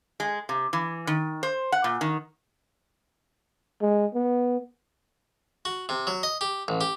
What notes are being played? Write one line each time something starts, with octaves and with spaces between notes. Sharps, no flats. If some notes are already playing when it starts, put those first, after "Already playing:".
G#3
C3
E3
D#3
C5
F#5
A#2
D#3
G#3
B3
F#4
C3
F#3
D#5
G4
A1
G4